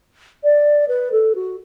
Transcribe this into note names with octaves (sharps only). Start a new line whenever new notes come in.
D5
B4
A4
F#4